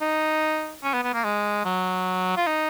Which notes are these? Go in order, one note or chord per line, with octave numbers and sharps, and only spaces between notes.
D#4
C#4
B3
B3
A#3
G#3
F#3
F4
D#4